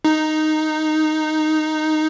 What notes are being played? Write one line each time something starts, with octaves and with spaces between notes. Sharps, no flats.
D#4